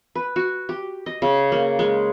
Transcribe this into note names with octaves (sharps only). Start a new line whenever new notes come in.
B4
F#4
G4
D#5
C#3
A#3
G#3